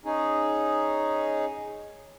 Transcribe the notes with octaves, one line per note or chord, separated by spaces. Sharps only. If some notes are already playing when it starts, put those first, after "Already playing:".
C#4 D#4 G#4